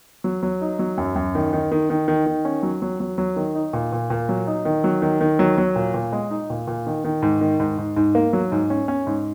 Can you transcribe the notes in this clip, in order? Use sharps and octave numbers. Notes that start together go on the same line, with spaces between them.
F#3
F#3
D#4
F#3
F#2
F#2
D#3
D#3
D#3
D#3
D#3
D#3
C#4
F#3
F#3
F#3
F#3
D#3
D#4
A#2
A#2
A#2
F#3
D#4
D#3
F#3
D#3
D#3
F#3
F#3
A#2
A#2
G#3
D#4
A#2
A#2
D#3
D#3
G#2
D#3
G#2
G#2
G#2
A#3
F#3
G#2
C#4
C#4
G#2